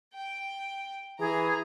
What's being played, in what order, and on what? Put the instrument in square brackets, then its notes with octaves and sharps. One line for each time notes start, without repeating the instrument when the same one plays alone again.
[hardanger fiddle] G5
[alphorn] E3 [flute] G#4 [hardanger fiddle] A#5